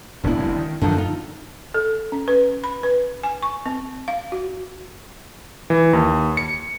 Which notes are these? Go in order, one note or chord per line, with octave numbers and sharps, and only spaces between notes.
E1 C#2 B3 D4 E4
F#1 G#3 C4
D#3
F#2 D3 D#3 F3
D#4 F4
A4
C#4
B4
B5
B4
G#5
C#6
C4
F5
F#4
E3
D#2
C#7